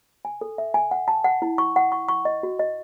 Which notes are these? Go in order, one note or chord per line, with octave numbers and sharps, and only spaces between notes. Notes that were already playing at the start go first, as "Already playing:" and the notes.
G#5
A4
E5
G#5
F#5
A5
F#5
E4
C#6
F#5
C#6
C#6
D#5
F#4
D#5